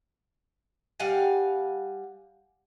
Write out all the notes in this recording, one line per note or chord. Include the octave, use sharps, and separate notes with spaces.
G3 F5 F#5 G#5